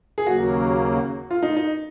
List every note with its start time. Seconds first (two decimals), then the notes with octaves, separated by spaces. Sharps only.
0.18 G#4
0.27 D#2 C#3 F#3 A#3 F#4
1.30 F4
1.43 D#4
1.56 D#4